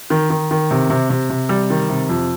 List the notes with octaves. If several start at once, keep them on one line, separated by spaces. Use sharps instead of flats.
D#3
D#3
D#3
C3
C3
C3
C3
G3
D#3
C3
F2